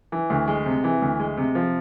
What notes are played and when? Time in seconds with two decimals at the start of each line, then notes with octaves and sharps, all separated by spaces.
0.12 E3
0.30 D2
0.48 G#3
0.66 C3
0.84 E3
1.02 D2
1.20 G#3
1.37 C3
1.55 F3